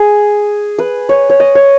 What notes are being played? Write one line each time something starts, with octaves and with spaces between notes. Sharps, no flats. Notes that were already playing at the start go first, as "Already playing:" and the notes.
Already playing: G#4
B4
C#5
C#5
D#5
C#5